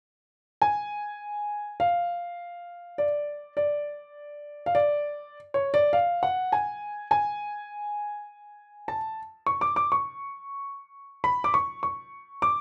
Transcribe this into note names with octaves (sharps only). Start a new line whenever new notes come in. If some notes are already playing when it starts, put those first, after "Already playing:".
G#5
F5
D5
D5
F5
D5
C#5
D5
F5
F#5
G#5
G#5
A5
C#6
D6
D6
C#6
B5
D6
C#6
C#6
D6